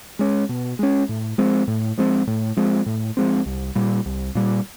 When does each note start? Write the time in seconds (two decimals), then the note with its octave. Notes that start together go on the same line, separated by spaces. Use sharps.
0.19 G#3 C#4
0.49 B2
0.79 G#3 C#4
1.09 A2
1.38 F3 G#3 C4
1.68 A2
1.98 F3 G#3 C4
2.27 A2
2.57 F3 G#3 C4
2.86 A2
3.17 F3 G#3 C4
3.46 C2
3.75 A#2 G3
4.06 C2
4.35 A#2 G3